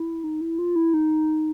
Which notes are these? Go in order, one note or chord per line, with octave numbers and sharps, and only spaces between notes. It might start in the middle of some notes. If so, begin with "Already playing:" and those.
Already playing: E4
D#4
E4
F4
E4
D#4